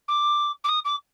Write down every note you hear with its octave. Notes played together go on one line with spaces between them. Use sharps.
D6
D6
D#6
D6